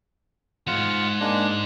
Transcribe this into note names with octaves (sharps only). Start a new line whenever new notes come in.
E2 G#2 F4 F#5
G#3 A#3 D4